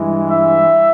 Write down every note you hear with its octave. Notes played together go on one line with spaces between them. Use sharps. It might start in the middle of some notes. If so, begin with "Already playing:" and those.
Already playing: G2 E3 G#3 E4
E5